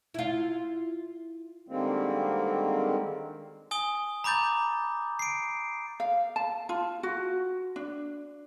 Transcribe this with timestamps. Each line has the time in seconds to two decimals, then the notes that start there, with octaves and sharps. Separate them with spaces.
0.14 E4 F4
1.69 D3 D#3 G3 G#3 A#3 C4
3.71 G#5 D#6 G7
4.24 A#5 B5 D6 G6 A6
5.19 C7 D7
6.00 F5
6.36 A5
6.69 F4
7.03 F#4
7.76 D4